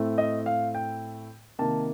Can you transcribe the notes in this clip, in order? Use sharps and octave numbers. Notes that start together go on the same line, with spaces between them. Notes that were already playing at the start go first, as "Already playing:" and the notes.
Already playing: A2 A3 C4
D#5
F5
G5
C3 D#3 A#3 A5